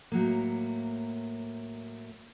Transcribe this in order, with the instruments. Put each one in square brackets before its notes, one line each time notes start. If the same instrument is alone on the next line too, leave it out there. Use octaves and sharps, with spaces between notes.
[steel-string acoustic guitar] A2 F#3 A#3